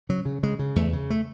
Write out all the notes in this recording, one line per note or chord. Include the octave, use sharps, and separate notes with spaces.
C#3 F#3
C#3
C#3 G#3
C#3
E2 A3
C#3
A3